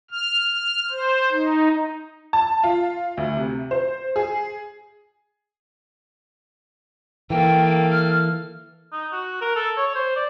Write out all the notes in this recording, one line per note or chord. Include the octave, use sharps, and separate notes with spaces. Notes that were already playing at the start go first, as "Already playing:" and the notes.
F6
F6
C5
D#4
A5
F4
D2
C3
C5
G#4
E3 A#3 A4 G5
F6
D#4
F#4
A#4
A4
C#5
C5
D5